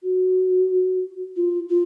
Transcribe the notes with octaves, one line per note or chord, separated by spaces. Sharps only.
F#4
F4
F4